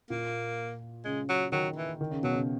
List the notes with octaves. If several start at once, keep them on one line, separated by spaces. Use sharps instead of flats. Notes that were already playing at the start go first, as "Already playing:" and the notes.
A#2 A#3
C#3 G#3
F#3
D#3 F#3
E3
D#3
C#3
B2 F#3
C#3